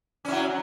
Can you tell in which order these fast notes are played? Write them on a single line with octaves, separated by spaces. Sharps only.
C#4 E4 F#3